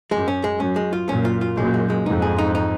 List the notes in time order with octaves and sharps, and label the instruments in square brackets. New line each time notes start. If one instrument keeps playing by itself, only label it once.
[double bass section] F#2 [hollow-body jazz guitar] G#3
[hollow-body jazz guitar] C#4
G#3
[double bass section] F#2 [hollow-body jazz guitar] C#4
[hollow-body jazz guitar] G#3
F4
[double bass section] F#2 A#2 [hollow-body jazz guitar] C#4
[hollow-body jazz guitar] F4
F4
[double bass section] F#2 A#2 [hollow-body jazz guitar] G#3
[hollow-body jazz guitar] G#3
G#3
[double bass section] F2 G#2 [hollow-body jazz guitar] D#4
[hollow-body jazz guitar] G#4
D#4
D#4